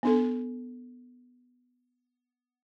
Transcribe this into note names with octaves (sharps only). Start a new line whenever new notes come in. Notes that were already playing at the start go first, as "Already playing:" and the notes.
B3 D4 A4